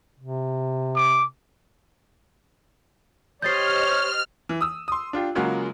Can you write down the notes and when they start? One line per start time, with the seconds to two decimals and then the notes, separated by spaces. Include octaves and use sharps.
0.20 C3
0.96 D6
3.42 G4 C5 C#5 D#5 F6 G6 A6 C7
4.49 E3
4.61 D#6 E6
4.88 C6 D#6
5.13 D4 F4 G4
5.35 C#3 F#3 G#3 A#3 F4 F#4